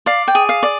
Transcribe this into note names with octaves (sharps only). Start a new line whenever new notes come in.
D5 F5
G5
G#4
F5
D5